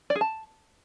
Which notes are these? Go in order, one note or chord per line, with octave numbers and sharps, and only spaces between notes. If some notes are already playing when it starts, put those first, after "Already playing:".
D5
G#4
A5